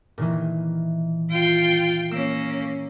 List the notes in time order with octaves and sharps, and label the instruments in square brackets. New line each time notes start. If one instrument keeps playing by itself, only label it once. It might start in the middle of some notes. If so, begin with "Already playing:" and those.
[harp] A#2 D#3 E3
[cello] F4 G5
[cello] A#3 C#4 [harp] E6